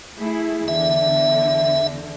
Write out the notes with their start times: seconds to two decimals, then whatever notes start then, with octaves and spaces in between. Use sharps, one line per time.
0.17 A3 E4 G#4
0.68 E2 D3 E5